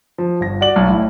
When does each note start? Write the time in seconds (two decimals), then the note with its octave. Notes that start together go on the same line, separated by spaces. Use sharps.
0.18 F3
0.40 G1 A#6
0.61 F#4 D5 F#7
0.76 B1
0.88 A1 E4